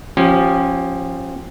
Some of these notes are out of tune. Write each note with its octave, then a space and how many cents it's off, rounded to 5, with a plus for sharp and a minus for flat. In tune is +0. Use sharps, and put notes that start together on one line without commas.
F3 +0 C#4 -25 G4 -25